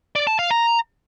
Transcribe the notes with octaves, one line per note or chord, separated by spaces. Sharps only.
D5
A5
F5
A#5